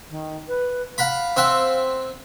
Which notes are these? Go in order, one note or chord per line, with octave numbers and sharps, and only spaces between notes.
D#3
B4
F5 F#5 A#5 B5
C4 E5 F#5